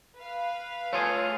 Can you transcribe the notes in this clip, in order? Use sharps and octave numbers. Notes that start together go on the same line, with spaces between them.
B4 F5
A3 F4 G#4 C#5